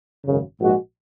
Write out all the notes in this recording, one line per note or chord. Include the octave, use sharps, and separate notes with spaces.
G#1 F#2 C#3
A#1 G#2 G#3 F#4